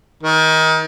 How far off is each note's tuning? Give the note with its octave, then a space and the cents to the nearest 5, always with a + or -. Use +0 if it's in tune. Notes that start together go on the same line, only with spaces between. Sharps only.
D#3 +25